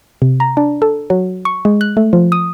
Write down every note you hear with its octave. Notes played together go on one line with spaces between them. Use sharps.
C3
A#5
D4
A4
F#3
C#6
G#3
F#6
A3
F3
D#6